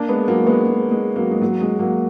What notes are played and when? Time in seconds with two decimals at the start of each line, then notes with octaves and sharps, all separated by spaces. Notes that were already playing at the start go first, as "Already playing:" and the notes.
Already playing: A#3 D4
0.09 G#3 B3
0.27 F#3 A#3
0.47 G#3 B3
0.66 G#3
0.91 G#3
1.16 F#3 A#3
1.31 G#3
1.41 F#3
1.61 G#3
1.79 F#3 A#3